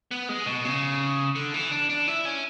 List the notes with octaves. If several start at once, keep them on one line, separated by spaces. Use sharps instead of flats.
B3
G#3
B2
C#3
D3
E3
D4
D4
E4
C#4